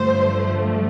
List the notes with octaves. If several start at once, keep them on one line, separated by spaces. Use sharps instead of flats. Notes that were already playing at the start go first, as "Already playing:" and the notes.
Already playing: G2 D3 F3 A3 C5